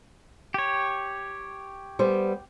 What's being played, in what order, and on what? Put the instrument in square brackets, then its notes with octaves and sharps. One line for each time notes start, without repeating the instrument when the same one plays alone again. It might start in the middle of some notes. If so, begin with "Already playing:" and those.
[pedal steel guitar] G4 C#5
[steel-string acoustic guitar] G3 B3 C5